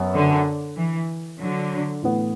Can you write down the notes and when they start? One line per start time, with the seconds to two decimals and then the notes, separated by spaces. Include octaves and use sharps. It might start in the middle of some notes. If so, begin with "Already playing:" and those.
Already playing: F#2 F#3 B3
0.14 D3
0.77 E3
1.39 D3 F#3
2.03 A2 E3 B3